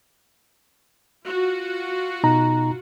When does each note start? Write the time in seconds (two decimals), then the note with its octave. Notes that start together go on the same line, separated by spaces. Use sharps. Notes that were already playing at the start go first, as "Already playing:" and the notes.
1.26 F4 F#4
2.24 B2 D#4 A#5